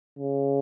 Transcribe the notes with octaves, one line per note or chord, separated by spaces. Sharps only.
C#3